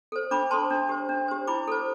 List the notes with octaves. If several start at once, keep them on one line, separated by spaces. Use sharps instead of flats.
A4 C5
D4 B5 D6
A4 C5 A5 C6
D4
G4 C5
D4
G4 C5
E4 B5 D6
A4 C5